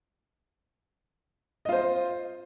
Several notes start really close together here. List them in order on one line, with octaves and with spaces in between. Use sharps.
D#5 F4 C5